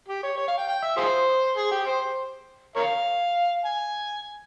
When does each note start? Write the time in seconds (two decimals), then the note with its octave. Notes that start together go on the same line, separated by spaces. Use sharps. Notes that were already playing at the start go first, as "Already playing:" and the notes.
0.08 G4
0.23 C#5
0.38 C#5
0.48 F5
0.58 G5
0.68 G5
0.83 E5
0.97 F4 G#4 C5
1.57 G#4
1.72 G4
1.86 C5
2.76 A#4 C#5 F5
3.65 G#5